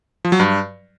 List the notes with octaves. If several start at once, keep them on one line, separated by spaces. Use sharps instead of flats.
F3
F#3
G2